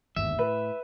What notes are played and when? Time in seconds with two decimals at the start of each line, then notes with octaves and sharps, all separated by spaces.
0.16 G1 D#2 G#2 E5
0.39 A2 B4